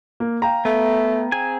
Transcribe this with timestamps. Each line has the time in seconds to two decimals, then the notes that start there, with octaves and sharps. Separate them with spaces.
0.20 A#3
0.42 F5 G5 A#5
0.65 A3 B3
1.32 C4 G#4 G#5